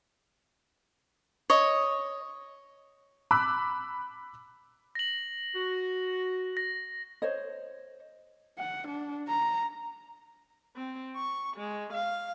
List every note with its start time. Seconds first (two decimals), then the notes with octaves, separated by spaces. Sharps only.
1.50 C#5 D#5
3.31 B5 D6 E6 F#6
4.95 A#6 F#7
5.55 F#4
6.57 A#6
7.22 C5 C#5 D#5
8.58 F#5
8.88 D4
9.28 A#5
10.76 C4
11.16 C#6
11.57 G#3
11.93 F5